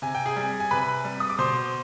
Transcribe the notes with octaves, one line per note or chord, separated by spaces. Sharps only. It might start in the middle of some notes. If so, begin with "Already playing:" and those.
C3 G#5
G5
G#4 G#5
G3
G#5
C3 B4 B5
G3
D#6
D6
B2 C5 C6